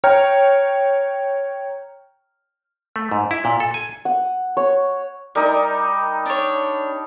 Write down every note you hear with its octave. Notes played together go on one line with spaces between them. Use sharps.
C#5 G5 A#5 F6
A3
G#2
E4
A#2
A4
G#5
F#5
C#5
G3 D#4 A#4
D4 C#5